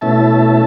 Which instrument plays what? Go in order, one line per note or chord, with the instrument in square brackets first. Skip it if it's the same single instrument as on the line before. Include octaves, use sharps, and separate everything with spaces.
[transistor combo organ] B2 A3 C#4 E4 E5 A5